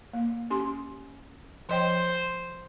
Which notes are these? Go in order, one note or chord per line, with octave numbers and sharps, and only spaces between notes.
A#3
C#4 G4 C6
F3 C5 D#5 G5